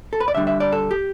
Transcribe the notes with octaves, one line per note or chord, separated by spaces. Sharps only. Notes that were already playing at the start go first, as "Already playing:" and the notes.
A4
B4
D5
D3 G3 D4 E5
E5
D5
A4
G4